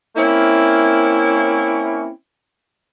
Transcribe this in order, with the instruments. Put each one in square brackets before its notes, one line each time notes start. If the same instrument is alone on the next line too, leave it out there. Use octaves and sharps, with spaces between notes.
[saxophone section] A#3 C4 C#4 E4